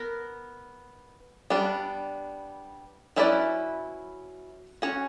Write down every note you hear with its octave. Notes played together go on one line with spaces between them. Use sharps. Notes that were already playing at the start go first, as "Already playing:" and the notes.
Already playing: B3 A#4
G3 B3 D4
F#3 C#4 E4 B4 D5
C#4 F#4 C#5